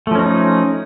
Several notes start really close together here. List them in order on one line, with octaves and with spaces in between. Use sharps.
A3 F3 C#4 D#4